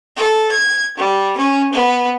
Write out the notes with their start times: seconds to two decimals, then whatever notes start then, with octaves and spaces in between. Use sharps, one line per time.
0.17 A4
0.53 G#6
0.98 G3
1.39 C#4
1.74 B3